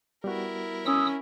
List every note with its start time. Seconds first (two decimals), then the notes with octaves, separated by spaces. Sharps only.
0.24 G3 B3 E4 F#4 A#4
0.86 C#4 D#6 E6